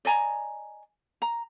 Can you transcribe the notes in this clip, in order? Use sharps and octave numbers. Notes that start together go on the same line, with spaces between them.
D5 D#5 G#5 A#5
A#5